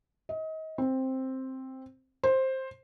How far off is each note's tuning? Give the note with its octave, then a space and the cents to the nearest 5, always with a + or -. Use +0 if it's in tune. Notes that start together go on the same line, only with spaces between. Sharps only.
D#5 +30
C4 +5
C5 +10